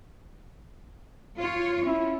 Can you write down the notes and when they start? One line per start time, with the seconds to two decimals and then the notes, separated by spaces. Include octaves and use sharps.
1.38 F4 C#5
1.85 C#4 E4